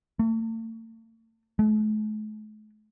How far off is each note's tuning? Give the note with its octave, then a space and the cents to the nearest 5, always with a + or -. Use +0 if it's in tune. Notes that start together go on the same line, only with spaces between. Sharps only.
A3 +40
A3 -45